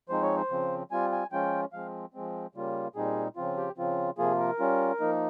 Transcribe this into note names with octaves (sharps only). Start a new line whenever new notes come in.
F3 G#3 C4 D#4 C5
C#5
C5
C#3 F3 C4
G3 C4 F4 G#5
G#5
F3 G#3 C#4 F4 G5
F3 G#3 C4 F5
F3 G#3 C4
C#3 G3 A#3 F4
A#2 G3 C4 D#4 G#4
C#3 F3 C4 F4
G4
C#3 F3 C4 F4
C3 F3 A#3 F4 G#4
A#4
G3 C#4 F4
F3 A#3 D#4